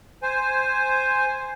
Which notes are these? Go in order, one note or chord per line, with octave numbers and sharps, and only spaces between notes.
C5 G#5